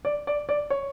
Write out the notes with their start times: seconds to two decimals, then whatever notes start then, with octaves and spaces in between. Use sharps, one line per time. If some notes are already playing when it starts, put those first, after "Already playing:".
0.05 D5
0.27 D5
0.49 D5
0.70 C#5